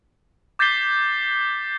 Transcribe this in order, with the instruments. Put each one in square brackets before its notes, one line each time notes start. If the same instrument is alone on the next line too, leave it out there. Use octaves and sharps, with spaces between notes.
[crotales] D6 G6 A6 B6 C7 G7